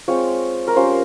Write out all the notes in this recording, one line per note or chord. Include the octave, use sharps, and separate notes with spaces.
G#3 C4 F4 C#5
A#4
G3 C#4 F4 C5